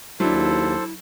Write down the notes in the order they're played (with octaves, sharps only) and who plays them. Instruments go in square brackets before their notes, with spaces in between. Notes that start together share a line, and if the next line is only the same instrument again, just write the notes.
[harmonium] D#2 [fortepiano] F#3 D4 [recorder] E4 [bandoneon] A4 C5